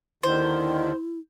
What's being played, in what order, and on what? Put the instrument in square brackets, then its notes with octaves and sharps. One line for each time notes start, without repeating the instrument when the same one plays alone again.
[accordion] D#2 D3 D#3 [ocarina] E4 [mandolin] C5